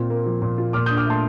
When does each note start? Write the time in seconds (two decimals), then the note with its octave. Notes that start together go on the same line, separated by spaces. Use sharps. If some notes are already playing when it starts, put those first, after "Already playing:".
Already playing: A#2 C4 F4
0.10 A#3
0.26 F3
0.42 A#2
0.58 F4
0.73 A#2 D6 F6
0.86 D4 D#6 G6
0.97 D6 F6
1.06 A3 A5 C6